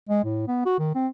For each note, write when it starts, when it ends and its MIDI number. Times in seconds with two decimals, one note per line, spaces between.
0.09 0.23 56
0.24 0.44 45
0.48 0.63 59
0.66 0.76 66
0.79 0.92 51
0.95 1.07 60